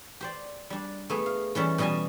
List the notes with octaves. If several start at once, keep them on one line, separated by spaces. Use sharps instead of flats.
G4 C5 D5
G3 D4
A3 B3 G#4
F5
E3 G3 C#4 A4
B2 E3 G3 D#5 G#5 A5